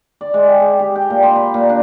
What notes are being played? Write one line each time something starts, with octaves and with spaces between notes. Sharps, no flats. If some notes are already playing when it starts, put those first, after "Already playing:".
D5
G#3
G5
G#4
G4
G5
A#2
C6
B5
A#2
D4